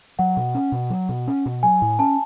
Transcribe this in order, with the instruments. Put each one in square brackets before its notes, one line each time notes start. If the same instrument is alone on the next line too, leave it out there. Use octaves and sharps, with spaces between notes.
[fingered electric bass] F#3 [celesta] F#5
[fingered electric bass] B2
C#4
B2
F#3
B2
C#4
B2
[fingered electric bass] F#3 [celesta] G#5
[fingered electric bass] A2
[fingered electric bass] C#4 [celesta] A5